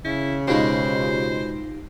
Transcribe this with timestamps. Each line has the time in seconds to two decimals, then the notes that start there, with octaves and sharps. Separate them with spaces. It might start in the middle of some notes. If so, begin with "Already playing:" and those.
0.05 C#3 E4
0.48 B2 G#3 D#4 F4 G4 C5